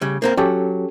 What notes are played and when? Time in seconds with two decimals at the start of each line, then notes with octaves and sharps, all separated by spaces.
0.01 C#3 G3
0.22 A#3 C4 A#4
0.37 F#3 C#4 G4 A4